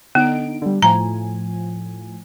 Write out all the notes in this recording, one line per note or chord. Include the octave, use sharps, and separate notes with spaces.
D3 B3 D#4 D7
D3 G3
A2 F3 G#5 A#5